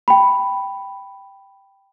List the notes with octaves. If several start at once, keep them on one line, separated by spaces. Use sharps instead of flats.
G5 B5